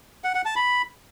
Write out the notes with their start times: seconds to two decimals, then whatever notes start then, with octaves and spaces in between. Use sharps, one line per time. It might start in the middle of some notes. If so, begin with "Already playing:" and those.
0.24 F#5
0.35 F#5
0.45 A5
0.56 B5